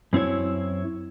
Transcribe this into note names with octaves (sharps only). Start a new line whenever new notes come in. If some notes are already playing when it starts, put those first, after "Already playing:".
F#2 C4 E4 C#5